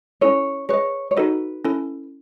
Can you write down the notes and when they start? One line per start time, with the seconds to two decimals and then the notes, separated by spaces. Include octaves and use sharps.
0.21 C#4 E4 A4 C#5
0.69 G#4 B4 C#5 D#5
1.11 C#5
1.17 D#4 F#4 A4 B4 D#5
1.65 C#4 E4 A4